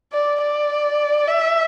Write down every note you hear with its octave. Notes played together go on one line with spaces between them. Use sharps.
D5
D5
E5